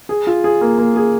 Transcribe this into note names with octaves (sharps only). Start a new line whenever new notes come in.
G#4
F4
G#4
A#3
A#3
G#4